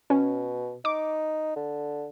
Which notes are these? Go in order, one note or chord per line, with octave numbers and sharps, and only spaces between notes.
B2 C#4
D#4 D6
D3